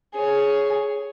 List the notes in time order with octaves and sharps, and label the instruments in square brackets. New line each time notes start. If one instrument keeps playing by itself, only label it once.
[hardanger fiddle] G#4 C#5